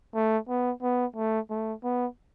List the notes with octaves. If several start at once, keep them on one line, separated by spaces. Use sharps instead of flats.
A3
B3
B3
A3
A3
B3